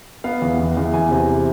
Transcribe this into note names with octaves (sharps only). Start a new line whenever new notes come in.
B3 F5
E2
E2
E2
E2 G#5
C3